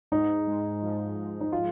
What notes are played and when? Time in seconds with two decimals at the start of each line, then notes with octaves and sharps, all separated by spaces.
0.12 G#2 D#4
0.47 G#3
0.82 F3
1.17 G#2
1.41 D#4
1.52 F4